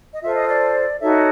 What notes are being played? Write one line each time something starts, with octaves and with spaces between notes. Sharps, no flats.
D#5
F4 A4 C5 E5
D#5
D5
D#4 F#4 A4 C#5 E5